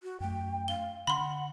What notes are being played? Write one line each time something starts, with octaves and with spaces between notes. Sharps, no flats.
F#4
F#2 A3 G5
F5 G7
D3 F#5 B5 C6